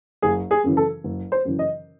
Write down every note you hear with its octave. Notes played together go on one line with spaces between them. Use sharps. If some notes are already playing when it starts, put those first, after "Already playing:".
F#1 G#4
G#4
F#2 C#3 E3
A4
F#1
C5
F#2 C#3 E3
D#5